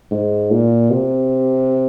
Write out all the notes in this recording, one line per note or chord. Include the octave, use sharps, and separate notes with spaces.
G#2
A#2
C3